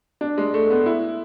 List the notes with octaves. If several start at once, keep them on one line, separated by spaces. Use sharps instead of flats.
D4
G#3
A3
B3
E4